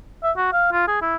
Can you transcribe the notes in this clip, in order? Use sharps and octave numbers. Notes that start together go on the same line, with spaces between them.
E5
F#4
F5
F4
G#4
E4